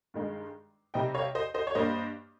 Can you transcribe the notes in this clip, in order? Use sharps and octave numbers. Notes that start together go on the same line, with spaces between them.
G2 D#3 G#3 D#4
C3 G3 C4 D#4 D#5 G5
C#5 F5
C5 D#5
C5 D#5
C#5
G2 G3 A#3 C5 D#5